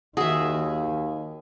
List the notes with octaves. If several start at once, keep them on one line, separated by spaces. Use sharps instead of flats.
D#2 D#3 F#4 G#4 E5